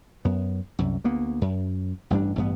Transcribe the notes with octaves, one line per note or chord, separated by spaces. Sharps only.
F#2 B3
C2 F#2
D2 A#3 B3
F#2
A1 G2 G3 D4
A1 G2 B3